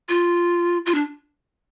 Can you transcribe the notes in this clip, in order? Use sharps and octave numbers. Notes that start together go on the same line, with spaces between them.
F4
F4
D4